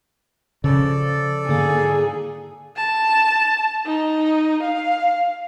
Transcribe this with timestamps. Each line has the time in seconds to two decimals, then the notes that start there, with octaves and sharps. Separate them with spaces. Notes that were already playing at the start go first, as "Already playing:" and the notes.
0.64 C#3 F3 A4 D5
1.49 G#2 D3 A#3 G#4
2.76 A5
3.86 D#4
4.62 F5